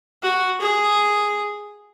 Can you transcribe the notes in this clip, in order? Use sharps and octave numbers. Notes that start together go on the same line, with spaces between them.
F#4
G#4